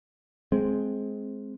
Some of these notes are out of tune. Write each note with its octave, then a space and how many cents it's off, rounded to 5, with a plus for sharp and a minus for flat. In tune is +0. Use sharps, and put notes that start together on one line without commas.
G#3 +15 C4 +0